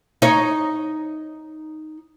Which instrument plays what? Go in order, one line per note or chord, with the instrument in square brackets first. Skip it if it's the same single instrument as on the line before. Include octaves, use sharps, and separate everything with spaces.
[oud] D#4 C#5